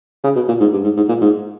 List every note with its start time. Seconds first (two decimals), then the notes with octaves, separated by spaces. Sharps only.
0.24 C#3
0.35 B2
0.48 A#2
0.60 G#2
0.73 G2
0.84 G#2
0.96 G#2
1.09 A#2
1.21 G#2